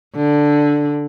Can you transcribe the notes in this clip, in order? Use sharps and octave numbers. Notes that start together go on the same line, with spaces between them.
D3